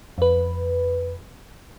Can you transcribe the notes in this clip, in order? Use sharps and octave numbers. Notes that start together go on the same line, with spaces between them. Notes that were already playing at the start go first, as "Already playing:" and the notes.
F2 B4